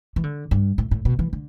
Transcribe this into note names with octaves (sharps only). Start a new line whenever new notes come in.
E3
D3
G2
A2
A2
B2
E3
D3